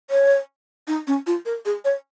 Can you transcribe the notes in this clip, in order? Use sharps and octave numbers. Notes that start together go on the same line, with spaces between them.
C#5
D#4
C#4
F4
A#4
G#4
C#5